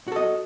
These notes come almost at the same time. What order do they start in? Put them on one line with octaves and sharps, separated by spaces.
F#4 A4 D#5